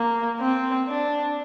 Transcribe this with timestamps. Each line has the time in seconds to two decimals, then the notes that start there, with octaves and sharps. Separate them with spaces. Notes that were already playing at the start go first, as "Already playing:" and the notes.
Already playing: A#3
0.40 C4
0.88 D4